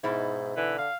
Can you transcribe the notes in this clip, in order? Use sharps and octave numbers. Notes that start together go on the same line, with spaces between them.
G#2 B2 D#4 E4
D3 E3
F5